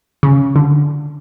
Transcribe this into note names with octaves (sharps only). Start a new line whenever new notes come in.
C#3
D3